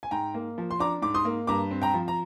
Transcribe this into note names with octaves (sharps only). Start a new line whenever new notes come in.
G#5
G#2 G5 A#5
A#3
F3
C6
D4 A#5 D6
G#2 D6
C6 D#6
A#3
G2 A#5 D6
C4
G5 A#5
F3
A#5